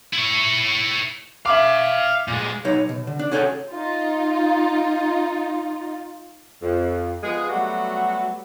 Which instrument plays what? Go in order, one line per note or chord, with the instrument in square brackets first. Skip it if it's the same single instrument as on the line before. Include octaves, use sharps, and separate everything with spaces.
[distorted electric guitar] E4 C#5
[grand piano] E5 D6 [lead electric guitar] F5 B5
[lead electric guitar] A#2 G#3
[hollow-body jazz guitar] B1 B2 D#4 C#5
B2
D3
D4
C#4 F#4 G#4 A4 C#5 G5
[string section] D#4 F4
[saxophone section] F2
F3 G#3 B3 G#4
F#3 G3 A3 B3 F#4